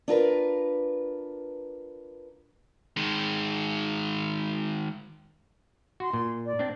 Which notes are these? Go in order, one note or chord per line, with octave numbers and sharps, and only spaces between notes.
D4 F4 A#4 B4
D#3 G#3
F#4 C6
A#2
D5
C4 D4